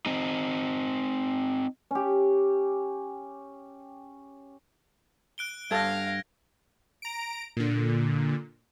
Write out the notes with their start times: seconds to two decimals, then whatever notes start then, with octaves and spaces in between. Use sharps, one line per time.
0.06 C4 D#4
1.91 C#4 G4
5.38 F#6 D7 G7
5.71 G2 A4 F5 A5 G#6 A#6
7.02 A#5 D7
7.57 A#2 D3